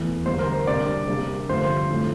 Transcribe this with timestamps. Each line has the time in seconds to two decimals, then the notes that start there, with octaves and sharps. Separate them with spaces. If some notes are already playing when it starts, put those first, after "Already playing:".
Already playing: E2 E3 A3
0.26 D3 G3 A#3 C5
0.39 A#4
0.53 C5
0.67 C3 G3 A#3 D4 D5
1.07 C3 G3 A#3 D4
1.49 G2 D3 F3 A3 C5
1.90 A2 F3 A3 C4